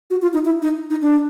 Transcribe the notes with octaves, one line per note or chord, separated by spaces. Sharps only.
F#4
F4
D#4
E4
D#4
D#4
D4